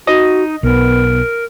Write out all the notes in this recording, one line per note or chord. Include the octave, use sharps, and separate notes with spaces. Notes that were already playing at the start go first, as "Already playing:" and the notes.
D#4 F#4 D#5
B1 B3 A#4